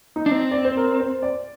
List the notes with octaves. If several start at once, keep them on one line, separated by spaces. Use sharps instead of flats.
D#4
D4
C4
D5
C5
A#4
C5
D5